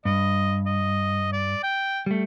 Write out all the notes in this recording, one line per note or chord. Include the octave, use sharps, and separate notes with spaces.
G2 D#5
D#5
D5
G5
G3 A3